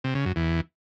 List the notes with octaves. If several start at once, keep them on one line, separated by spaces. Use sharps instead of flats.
C3
C#3
F#2
E2